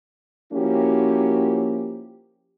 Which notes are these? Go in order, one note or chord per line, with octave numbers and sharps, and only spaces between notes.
F3 A#3 C#4 E4 F#4 G4